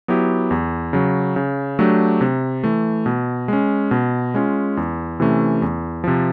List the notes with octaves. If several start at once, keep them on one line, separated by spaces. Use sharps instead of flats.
F#3 B3 E4 G4
E2
C#3 F#3
C#3
F#3 A3 D4 G4
C3
E3 A3
B2
G#3 C#4
B2
G#3 C#4 F4
E2
C3 E3 A3 C#4
E2
C3 F3